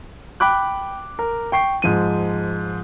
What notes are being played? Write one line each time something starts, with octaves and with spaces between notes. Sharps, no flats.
G5 B5 D6 F#6
A#4
G5 C#6 C7
G#2 F3 D#7